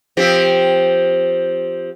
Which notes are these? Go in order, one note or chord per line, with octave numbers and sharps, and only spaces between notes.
F3 C4 G4